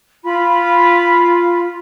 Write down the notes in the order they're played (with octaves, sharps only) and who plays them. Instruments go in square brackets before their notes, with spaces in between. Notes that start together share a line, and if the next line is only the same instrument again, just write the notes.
[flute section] F4 B5